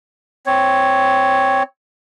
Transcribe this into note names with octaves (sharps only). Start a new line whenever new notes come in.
C4 C#5